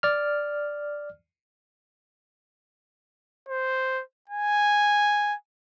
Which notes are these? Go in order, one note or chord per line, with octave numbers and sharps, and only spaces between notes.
D5 F6
C5
G#5